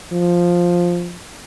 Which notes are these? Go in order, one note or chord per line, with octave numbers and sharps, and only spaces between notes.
F3